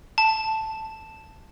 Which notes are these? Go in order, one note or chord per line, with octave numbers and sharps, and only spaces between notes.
A5